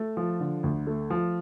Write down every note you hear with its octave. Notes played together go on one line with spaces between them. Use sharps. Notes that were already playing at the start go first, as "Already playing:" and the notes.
Already playing: A3
F3
D3
D2
A3
F3